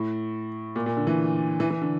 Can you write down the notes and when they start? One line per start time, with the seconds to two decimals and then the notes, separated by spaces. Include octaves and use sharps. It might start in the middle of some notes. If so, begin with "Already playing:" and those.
Already playing: A2
0.76 A#2
0.86 A#2
0.97 D3
1.07 E3
1.60 E3
1.70 E3
1.81 D3